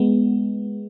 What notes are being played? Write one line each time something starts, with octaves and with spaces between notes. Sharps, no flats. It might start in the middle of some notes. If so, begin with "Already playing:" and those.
Already playing: G#3 B3